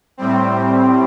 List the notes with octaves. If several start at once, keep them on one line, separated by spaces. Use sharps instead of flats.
A2 G3 C4